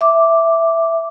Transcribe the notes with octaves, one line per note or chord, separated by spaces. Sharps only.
E5 D6